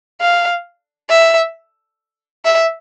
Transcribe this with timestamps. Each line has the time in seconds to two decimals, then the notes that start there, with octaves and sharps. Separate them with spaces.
0.21 F5
1.10 E5
2.45 E5